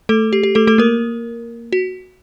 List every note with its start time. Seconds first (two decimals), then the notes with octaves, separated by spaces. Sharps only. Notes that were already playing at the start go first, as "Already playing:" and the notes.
0.09 A3 A4
0.33 G4
0.43 G4
0.55 A3 A4
0.67 A3 A4
0.78 A#3 A#4
1.72 F#4